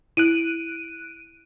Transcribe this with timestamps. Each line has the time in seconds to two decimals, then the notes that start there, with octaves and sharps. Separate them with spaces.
0.17 E4 F#6 D7 D#7